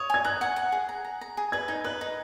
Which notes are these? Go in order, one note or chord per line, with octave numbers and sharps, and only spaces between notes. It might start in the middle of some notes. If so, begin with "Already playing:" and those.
Already playing: C#5 D#6
G#5 G#6
A#5 F#6
F#5
F#5
G#4
A#5
A#5
A#5
G#4
B4 G#6
D#4
B4 F#6
D#4